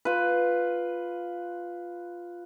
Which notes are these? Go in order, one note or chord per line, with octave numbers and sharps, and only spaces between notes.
F4 B4